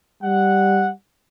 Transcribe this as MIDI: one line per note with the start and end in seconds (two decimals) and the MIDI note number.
0.23 0.92 55
0.23 0.90 78